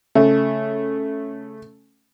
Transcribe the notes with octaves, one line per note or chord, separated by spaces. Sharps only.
C#3 A3